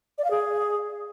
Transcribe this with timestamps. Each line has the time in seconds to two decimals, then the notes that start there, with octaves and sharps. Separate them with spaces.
0.18 D5
0.24 F5
0.31 G#4